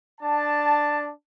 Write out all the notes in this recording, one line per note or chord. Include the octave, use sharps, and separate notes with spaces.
D4 A5